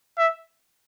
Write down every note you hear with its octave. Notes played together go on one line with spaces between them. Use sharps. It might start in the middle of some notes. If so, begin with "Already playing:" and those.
E5